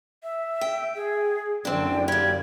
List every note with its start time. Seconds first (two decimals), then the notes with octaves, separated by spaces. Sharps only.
0.23 E5
0.61 G5
0.96 G#4
1.65 F#1 F#2 D3 C4 D4 G5
2.08 G3 A#3 G#6